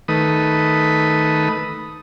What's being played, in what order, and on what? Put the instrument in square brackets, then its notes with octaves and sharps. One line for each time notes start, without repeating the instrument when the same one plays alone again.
[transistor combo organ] D#3 A3 B4 D#6